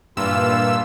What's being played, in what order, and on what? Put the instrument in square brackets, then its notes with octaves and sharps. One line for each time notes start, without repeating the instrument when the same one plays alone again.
[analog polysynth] G2 A#2 E6 [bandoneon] E3 F4